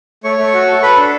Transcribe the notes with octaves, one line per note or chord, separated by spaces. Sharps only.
A3 C#5 C#6
A3
F#4
A4
A4 B4 B5
D4